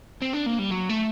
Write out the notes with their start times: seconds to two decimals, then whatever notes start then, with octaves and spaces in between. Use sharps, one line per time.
0.22 C4
0.33 D4
0.46 A#3
0.59 G3
0.71 F#3
0.89 A3